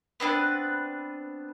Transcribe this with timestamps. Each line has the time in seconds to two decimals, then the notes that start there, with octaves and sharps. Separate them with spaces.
0.20 B3 C4 D4 B4